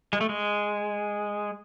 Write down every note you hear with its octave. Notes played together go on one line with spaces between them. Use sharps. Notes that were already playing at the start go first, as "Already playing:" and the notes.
G#3
A3
G#3